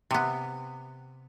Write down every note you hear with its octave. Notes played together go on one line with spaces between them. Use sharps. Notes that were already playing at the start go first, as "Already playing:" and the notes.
C3 B3